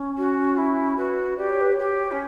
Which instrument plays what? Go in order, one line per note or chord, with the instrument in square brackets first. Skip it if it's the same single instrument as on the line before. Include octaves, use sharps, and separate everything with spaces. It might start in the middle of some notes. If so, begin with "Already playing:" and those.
Already playing: [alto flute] C#4
[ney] F#4
E4
[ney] F#4 [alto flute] B4
[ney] G4 [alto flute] D5
[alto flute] C#5
B4
C#5
[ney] G4
C#4